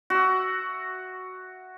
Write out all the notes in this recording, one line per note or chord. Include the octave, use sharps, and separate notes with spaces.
F#4 E5